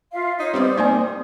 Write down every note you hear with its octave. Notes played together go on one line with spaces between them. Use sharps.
F4 E5 F5
D#4 C#5 D#5
G3 B3 C4 C5 D5 D#6
A#3 C4 D#4 D5 G#5